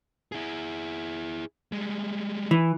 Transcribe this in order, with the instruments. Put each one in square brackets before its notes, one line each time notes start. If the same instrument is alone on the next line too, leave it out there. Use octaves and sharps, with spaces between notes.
[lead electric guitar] E4 G#4
G3 G#3
[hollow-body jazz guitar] E3